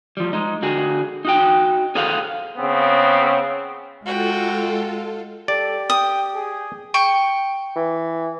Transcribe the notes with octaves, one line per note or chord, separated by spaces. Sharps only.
F3 G3
G#3 D#4
D3 F#4 G#4
D#4 F#4 G5
G#4 A4 C5 F5 F#5
C#3 B3 C4
G#3 F4 F#4 A4 G5
G4 A4 D5
G5 D#6
G#4
G5 C#6
E3